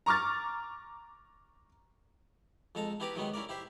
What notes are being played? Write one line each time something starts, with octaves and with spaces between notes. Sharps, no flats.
A#5 C#6 D6 F6 A6
F2 G#3 A4 A5 A#5
B3 E4 G4 B4 A#5 D6
C3 D#3 F#3 G#3 B3 D#4
C#4 E4 A#4 D5
E4 G4 C5 E5